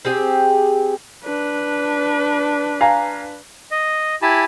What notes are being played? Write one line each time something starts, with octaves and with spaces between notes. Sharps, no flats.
C4 G4 G#4
D4 B4
F5 G#5 A#5
D#5
E4 G4 G#5 A5 B5